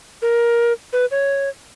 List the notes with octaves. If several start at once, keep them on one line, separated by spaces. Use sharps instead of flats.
A#4
B4
C#5